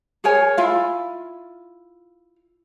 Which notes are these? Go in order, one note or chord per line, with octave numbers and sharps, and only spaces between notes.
G#4 A#4 C#5 G#5
E4 F4 F5